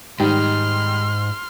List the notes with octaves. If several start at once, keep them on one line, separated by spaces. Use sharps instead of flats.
G#2 D#3 G3 C6 F6